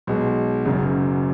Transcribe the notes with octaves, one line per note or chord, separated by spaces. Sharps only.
B1 B2 G#3
F#1 F#2 C#3